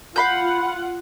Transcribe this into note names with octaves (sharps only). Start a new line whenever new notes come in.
F4 F5 F#5 B5 G6